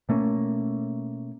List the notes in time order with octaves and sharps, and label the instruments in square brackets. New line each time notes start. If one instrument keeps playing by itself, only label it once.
[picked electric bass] B2 A3 A#3 C#4